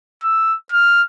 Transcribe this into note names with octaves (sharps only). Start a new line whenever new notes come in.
E6
F6